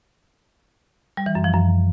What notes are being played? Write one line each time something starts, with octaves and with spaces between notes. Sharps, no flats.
G3
E3
F#2
F3
F#2